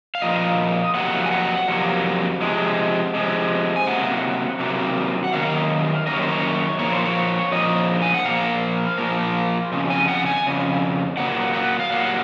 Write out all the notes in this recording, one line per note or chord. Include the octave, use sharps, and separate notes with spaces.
F5
A#2 F3 A#3 D#5
F2 C3 F#3 A#3 F#5
G#5
F#5
F2 C3 F#3 A#3
C3 F3 G#3
C3 F3 G#3
G#5
C3 F#3 A#3 F#5
C3 F#3 A#3
F#5
F#2 D#3 A#3 F5
F#2 D#3 A#3 D#5
C#5
C5
C#5
A#2 F3 A#3 C#5
C5
C#5
A#2 F3 A#3 D#5
G#5
F#5
A#2 F3 A#3 F5
A#2 F3 A#3
F2 C#3
G#5
F#5
G#5
F2 C#3
A#2 F#3 A#3 F#5
F#5
F5
A#2 F#3 A#3 F#5